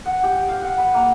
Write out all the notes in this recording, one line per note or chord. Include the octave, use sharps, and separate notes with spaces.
F#5
G4
F5
F#5
B4
A#3